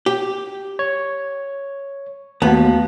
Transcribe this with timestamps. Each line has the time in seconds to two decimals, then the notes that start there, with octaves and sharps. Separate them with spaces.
0.06 G4
0.79 C#5
2.42 D#2 A3 B3 F#4 B4 F5 F#5 A5